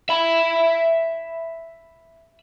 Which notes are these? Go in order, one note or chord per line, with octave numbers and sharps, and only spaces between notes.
E5 B5